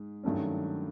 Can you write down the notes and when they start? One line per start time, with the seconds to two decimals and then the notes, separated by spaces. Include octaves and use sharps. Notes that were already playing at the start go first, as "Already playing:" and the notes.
Already playing: G#2
0.24 G2 D#3 F#3 A3 C#4